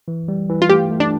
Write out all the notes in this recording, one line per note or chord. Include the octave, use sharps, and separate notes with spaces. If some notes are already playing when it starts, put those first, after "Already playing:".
E3
G3
E3
F4
A3 G4
A3
D4